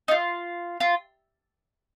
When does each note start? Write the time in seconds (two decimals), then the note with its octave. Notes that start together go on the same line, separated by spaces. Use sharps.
0.08 D#4
0.11 F4
0.80 F4